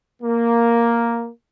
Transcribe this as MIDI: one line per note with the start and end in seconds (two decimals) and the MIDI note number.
0.22 1.29 58